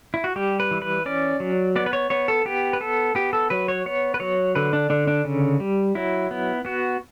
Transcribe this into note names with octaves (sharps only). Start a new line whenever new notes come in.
E4
F#4
G3 G4
B4
E3
B4
C#4 D5
F#3
B3 D5
B4
C#5
B3 C#5
A4
B3 G4
B4
B3 A4
B3 G4
A4
F#3 B4
C#5
B3 C#5
B4
F#3 C#5
D3 B4
D4
D3 D4
D4
C#3
G3
F#3 E4
B3
B3 F#4